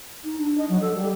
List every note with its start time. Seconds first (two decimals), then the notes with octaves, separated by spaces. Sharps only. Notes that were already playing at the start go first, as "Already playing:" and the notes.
0.24 D#4
0.39 D4
0.58 D#5
0.69 F#3
0.81 A4
0.95 G3